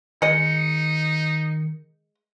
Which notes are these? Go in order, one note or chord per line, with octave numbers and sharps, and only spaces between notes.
D#3 G#3 D#4 D#5 C#7